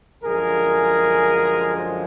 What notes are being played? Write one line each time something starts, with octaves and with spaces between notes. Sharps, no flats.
F#2 D3 F3 G#3 G#4 A#4
C5